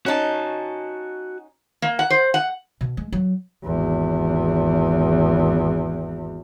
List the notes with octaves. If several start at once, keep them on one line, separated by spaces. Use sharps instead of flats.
C#4 D#4 F#4 A5
A#3
F#5
C5
F#5
B2
G#3
F#3
G#1 E2